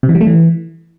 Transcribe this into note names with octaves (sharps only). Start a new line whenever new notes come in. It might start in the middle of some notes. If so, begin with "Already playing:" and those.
C3
E3
G3
A3
E3